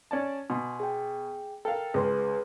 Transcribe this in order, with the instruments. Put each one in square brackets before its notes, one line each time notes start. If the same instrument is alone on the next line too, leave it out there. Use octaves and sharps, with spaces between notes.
[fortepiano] C#4 D5 A5
[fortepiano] B2 [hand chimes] G#5 C6
[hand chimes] G#4 G5
[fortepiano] A4 A#4 F5 [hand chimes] G5
[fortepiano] C#2 [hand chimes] G#4 B4 C6